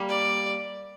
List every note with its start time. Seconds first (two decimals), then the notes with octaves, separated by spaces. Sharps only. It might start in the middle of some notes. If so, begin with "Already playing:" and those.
Already playing: G3 A#3
0.09 D5